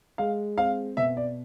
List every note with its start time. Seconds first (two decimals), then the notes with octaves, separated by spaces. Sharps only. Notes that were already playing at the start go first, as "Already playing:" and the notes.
0.18 G#3 F5
0.58 C4 F5
0.97 B2 E5
1.17 D5